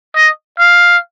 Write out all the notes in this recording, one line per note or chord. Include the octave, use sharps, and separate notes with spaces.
D#5
F5